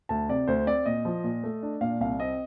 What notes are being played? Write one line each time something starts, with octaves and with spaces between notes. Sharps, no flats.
D2 A5
C3 D5
D2 C5
C4 D5
A#2 D#5
F3
A#2
A3
D4
A#2 F5
C2 F5
C4 D#5